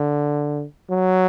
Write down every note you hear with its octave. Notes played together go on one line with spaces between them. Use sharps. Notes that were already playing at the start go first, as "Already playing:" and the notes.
Already playing: D3
F#3